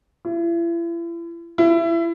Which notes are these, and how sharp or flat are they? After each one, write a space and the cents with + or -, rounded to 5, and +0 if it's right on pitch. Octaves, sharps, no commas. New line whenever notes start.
E4 +40
E4 +25